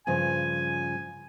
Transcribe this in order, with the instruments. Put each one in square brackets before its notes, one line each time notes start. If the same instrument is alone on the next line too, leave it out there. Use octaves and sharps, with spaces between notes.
[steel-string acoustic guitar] G2 C#3 F3 [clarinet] G#5